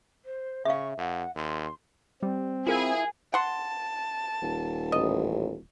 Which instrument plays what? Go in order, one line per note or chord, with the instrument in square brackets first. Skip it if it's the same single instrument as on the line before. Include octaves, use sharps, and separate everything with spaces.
[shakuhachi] C5
[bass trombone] C#3 [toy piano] E5 F5 [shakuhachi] C#6
[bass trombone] F2 [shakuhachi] F#5
[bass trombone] D#2 [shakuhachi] C6
[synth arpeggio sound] G3 [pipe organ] C4
[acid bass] E4 [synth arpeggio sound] F4 A#4 F5 [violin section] G#4
[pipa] F#5 C6 [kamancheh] A5
[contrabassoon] D#1
[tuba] A1 [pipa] D#5